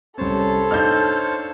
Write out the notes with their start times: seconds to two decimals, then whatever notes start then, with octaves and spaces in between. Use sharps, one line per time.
0.18 C2 C#4 A4 C5 C#5 A5
0.71 D4 D#4 F5 F6 G6